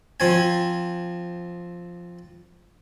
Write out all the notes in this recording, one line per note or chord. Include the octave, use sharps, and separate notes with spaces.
F3 C4 G#5